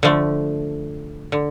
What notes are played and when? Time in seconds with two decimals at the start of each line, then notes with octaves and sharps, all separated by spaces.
0.03 D3 F3 A3
1.32 D3